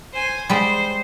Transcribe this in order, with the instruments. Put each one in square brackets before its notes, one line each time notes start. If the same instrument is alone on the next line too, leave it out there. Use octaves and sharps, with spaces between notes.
[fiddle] C5 G#5
[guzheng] G3 G#3 [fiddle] C5